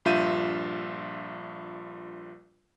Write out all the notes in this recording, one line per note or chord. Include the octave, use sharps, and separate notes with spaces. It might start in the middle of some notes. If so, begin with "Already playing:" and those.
A#1 G2 F4 E5 G6 D#7